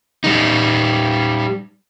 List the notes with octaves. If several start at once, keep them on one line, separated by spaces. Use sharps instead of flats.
G3 D#4